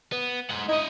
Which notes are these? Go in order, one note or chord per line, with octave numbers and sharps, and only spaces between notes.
B3
G#3 F#5
D#4 E4 D#5